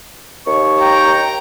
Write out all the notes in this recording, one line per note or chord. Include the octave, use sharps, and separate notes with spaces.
D#2 C#6
G5 A#5